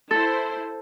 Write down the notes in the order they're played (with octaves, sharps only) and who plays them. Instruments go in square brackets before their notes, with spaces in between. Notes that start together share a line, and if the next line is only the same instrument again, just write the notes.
[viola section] E4 C5 [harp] A4